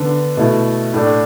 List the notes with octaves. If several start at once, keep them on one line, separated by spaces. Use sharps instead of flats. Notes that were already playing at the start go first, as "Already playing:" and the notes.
Already playing: D3 B3 D4
B2 A3 E4
A2 A3 D4